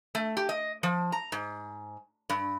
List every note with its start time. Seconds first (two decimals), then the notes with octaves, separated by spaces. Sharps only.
0.15 A3
0.37 G4
0.49 D#5
0.83 F3
1.12 A#5
1.32 G#2
2.30 G2